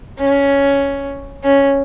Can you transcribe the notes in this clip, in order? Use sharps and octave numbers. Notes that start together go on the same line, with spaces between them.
C#4
C#4